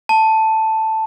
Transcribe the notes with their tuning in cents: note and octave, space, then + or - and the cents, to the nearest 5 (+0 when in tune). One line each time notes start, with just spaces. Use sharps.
A5 +5